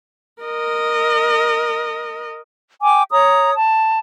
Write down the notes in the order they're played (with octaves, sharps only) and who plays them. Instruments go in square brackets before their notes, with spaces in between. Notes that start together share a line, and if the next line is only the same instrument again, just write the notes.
[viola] A#4 D#5
[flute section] G5 G#5 D6
C#5 A#5 D#6
A5